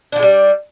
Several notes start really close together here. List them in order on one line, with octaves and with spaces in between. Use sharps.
D4 F3 G#3 G3